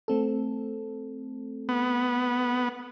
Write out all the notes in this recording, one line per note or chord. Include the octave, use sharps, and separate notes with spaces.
A3 C4 A4
B3